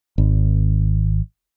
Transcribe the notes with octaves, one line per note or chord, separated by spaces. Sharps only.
G#1